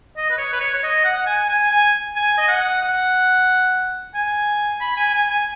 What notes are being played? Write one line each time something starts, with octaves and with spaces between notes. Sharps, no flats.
D#5
B4
C#5
B4
C#5
C#5
D#5
F#5
F#5
G#5
G#5
G#5
G#5
D#5
F#5
F#5
G#5
B5
G#5
G#5
G#5